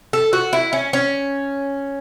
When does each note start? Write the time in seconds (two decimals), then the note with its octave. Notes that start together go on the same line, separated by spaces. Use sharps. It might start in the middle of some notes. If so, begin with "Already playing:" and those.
0.13 A4
0.33 F#4
0.53 E4
0.73 C#4
0.93 C#4